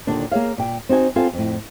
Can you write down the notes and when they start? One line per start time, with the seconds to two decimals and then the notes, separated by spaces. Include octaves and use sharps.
0.07 D#2 A#2 D3 D4
0.32 A#3 G#4 C#5 F5
0.57 A#2 G5
0.89 C4 D#4 F#4 G#5
1.16 C4 F4 A4 F5 G#5
1.33 F2 A2